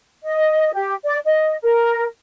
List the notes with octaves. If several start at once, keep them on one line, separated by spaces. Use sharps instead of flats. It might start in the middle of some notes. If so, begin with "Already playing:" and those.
D#5
G4
D5
D#5
A#4